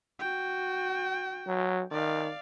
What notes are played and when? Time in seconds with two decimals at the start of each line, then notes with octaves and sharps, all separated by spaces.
0.20 F#4 G5
1.47 F#3
1.91 D#3 D5 F5